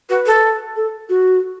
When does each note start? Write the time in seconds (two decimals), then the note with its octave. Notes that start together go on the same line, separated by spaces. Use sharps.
0.09 F#4 B4
0.26 A4
0.76 A4
1.09 F#4